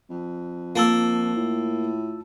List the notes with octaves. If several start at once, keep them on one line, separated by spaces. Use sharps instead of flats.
F2
A#3 F4 A5 E6
A2